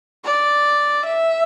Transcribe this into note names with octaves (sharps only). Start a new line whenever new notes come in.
D5
E5